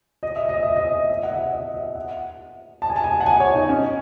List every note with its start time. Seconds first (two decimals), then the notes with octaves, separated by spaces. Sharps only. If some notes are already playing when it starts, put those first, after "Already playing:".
0.23 D#5
0.36 E5
0.49 D#5
0.63 E5
0.76 D#5
1.02 D#5
1.10 E5
1.23 F#5
1.32 E5
1.53 D#5
1.74 E5
1.95 F#5
2.82 A5
2.90 G#5
2.96 A5
3.04 G#5
3.20 F#5
3.26 G#5
3.40 C#5
3.55 D#4
3.69 C#4